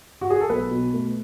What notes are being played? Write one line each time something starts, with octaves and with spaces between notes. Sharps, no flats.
F#4
G#4
A4
B1 B4
B2
A3